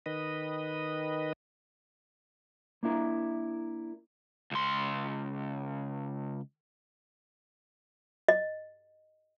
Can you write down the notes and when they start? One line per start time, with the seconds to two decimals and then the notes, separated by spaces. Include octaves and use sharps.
0.06 D#3 B4 D#5
2.83 A#3 D4 E4 A#4
4.51 C#2 C6
8.28 D#5